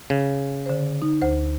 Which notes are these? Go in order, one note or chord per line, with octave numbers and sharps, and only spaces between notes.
C#3
D3 C5
D#4
D2 C5